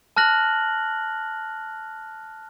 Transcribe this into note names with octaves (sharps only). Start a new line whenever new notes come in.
A5 F6 F#6 A#6 F#7